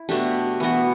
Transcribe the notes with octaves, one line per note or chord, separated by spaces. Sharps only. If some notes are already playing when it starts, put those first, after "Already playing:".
Already playing: E4
B2 A3 D4 G4
E3 B3 F#4